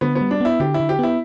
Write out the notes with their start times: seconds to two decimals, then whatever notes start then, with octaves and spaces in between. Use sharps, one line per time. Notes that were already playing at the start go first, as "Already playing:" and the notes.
0.01 D3 B3
0.15 B3
0.21 G3
0.31 D4
0.41 B3 E4
0.60 D3 G4
0.74 E4
0.80 D3
0.89 G4
0.99 B3 E4